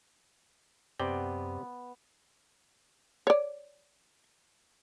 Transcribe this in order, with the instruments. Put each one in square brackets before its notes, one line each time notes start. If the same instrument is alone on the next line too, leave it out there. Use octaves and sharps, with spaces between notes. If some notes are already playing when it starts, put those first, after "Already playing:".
[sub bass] F#2 [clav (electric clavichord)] C3 D5 G5 [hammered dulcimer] B3
[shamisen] C#5 D5